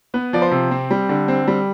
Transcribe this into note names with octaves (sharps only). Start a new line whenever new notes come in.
B3 B4
F3 D5
C5
C3
C4
G3
D3
C4
G3